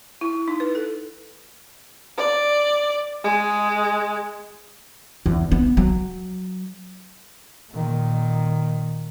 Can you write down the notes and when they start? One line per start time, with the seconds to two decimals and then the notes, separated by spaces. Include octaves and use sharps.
0.21 E4
0.48 D#4
0.60 B4
0.75 A4
2.17 D5
3.24 G#3
5.26 E2
5.52 B3
5.77 F#3
7.70 A#2 D#3